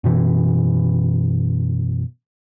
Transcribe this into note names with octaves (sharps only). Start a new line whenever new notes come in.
F#2 B2 E3